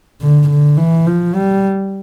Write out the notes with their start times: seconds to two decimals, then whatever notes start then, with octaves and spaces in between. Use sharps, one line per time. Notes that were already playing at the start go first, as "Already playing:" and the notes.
0.22 D3
0.49 D3
0.77 E3
1.07 F3
1.35 G3